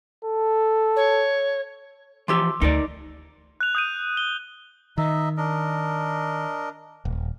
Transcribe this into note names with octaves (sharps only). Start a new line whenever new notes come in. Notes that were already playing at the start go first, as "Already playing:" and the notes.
A4
C#5
E3 F3 G4 C6 D6 E6
D2 D#4 A#4 D5
F#6 F7
D#6 G6 D#7
G7
D#3 D#4 D#5 E5
D4 A#4 D#5
D#1